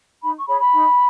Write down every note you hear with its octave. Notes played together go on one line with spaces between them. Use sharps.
D#4 B5
C#6
G#4 C#5 B5
B5
D#4